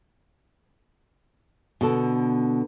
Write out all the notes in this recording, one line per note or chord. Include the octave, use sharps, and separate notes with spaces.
B2 D3 A4